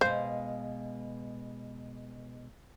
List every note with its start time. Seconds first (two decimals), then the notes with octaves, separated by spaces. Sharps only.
0.01 B2 G#3 C5 F5